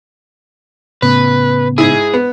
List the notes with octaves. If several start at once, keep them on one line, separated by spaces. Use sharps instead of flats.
A2 C#3 B3 B4
G#2 E4 G#4
B3